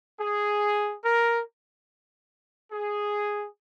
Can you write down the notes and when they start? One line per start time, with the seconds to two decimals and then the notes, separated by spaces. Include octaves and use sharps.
0.20 G#4
1.05 A#4
2.72 G#4